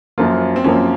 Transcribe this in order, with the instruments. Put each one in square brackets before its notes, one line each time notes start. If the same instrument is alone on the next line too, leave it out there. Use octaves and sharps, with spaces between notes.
[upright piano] F#2 F3 A#3 [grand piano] F4
[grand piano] C4
[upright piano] F#2 F3 A#3 [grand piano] C#4